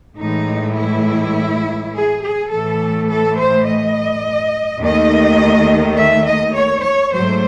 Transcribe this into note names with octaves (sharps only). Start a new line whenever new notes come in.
A2 E3 G#3 D#4
E4
G#4
G#4
A2 E3 A3 A4
A4
C5
D#5
D#2 D#3 A3 D#5
E5
D#5
C#5
C#5
G#2 F#3 A3 C5